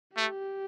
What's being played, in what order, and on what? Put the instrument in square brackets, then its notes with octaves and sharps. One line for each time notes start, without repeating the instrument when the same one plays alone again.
[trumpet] A3 [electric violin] G4